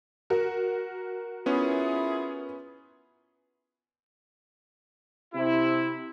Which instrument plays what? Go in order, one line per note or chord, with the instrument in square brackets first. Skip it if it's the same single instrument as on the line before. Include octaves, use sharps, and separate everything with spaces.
[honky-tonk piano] F#4 A#4
[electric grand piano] B3 C#4 [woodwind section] E4 F4 G#4
[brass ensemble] C3 E4